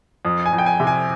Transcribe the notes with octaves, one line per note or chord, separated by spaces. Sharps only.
F2
G#5
F2
G5
G#5
C3
G#5